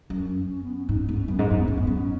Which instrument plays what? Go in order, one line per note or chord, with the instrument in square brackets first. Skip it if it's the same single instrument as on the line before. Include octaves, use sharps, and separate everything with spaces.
[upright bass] F#2 [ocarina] C#4
[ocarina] C#4
C#4
B3
C#4
[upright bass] G#2 [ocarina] D#4
[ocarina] B3
[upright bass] G#2
[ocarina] C#4
[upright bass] F#2 [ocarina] B3
[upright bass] G#2 [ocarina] C#4
[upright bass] F#2 [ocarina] D#4
[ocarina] B3
[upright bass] G#2 [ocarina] C#4
[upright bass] A2
[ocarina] B3
[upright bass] F#2
[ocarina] C#4